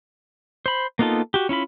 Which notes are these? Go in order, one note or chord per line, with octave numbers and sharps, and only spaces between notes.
C5 B5
A#3 B3 D#4 F4 A4
F#4 G4
C#4 E4 F4 B5